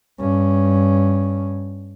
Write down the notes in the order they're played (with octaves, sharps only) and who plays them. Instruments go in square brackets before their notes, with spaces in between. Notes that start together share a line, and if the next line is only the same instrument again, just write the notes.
[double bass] G2 C#4